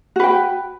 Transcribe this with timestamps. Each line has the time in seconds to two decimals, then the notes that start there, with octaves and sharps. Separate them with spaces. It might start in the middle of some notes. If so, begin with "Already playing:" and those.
0.16 F#4
0.20 B4
0.24 G5